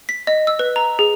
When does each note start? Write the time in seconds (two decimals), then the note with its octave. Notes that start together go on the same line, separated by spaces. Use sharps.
0.09 B6
0.27 D#5
0.47 E6
0.59 B4
0.76 A#5
0.99 G#4